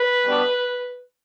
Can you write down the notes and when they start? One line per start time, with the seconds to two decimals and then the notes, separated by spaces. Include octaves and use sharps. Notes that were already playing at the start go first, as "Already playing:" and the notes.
Already playing: B4
0.24 B2 G3 B3 D4